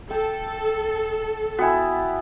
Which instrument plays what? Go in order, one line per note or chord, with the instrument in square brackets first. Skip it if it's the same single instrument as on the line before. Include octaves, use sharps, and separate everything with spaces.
[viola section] A4 [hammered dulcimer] G5
[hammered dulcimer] B3 E4 [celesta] F#4 G5 G#5